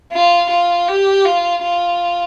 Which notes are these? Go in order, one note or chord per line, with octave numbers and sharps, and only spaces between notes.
F4
F4
G4
F4
F4